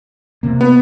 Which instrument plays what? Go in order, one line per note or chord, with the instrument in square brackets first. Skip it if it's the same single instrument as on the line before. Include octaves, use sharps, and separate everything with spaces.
[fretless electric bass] C3 A#3
[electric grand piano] B3